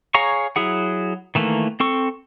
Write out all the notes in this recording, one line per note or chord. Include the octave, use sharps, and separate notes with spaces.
G#4 C#5 F5 A#5 C#6
F#3 E4 G#4 F#5
D#3 E3 A3 A#3
C4 A4 C#6